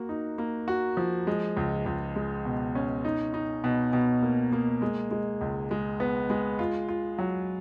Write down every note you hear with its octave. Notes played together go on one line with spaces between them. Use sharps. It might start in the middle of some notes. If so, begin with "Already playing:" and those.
Already playing: A#3 F#4
D#4
A#3
F#4
F3
G#3
C#2
C#2
G#3
B2
C#4
D#4
D#4
B2
B2
A#3
A#3
G#3
G#3
C#2
G#3
B3
G#3
F4
F4
F#3